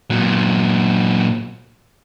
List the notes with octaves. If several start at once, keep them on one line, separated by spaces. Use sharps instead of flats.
A#2 F#3